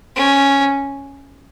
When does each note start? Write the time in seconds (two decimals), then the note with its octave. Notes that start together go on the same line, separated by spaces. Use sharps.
0.16 C#4